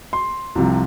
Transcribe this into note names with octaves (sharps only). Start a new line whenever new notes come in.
C6
C2 C3 F3